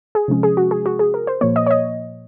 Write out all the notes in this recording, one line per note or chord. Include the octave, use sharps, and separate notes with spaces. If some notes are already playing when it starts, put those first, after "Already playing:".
G#4
C3 F3 G#3 C#4
G#4
F#4
G#4
F#4
G#4
A#4
C5
A#2 F3 A#3 C#5
D#5
C#5
D#5